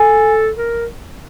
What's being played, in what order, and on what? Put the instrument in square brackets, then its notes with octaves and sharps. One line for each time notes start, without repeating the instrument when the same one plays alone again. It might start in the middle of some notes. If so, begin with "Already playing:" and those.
Already playing: [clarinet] A4 [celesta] G#5
[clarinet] A#4